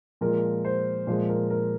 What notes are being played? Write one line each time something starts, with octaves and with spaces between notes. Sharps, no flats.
A#2 F3 G#3 A#4
C5
A#2 F3 G#3 C5
A#4
A#4